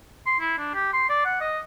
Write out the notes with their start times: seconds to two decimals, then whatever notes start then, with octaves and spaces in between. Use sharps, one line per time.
0.26 C6
0.40 E4
0.58 D4
0.74 G4
0.93 C6
1.09 D5
1.25 F#5
1.41 D#5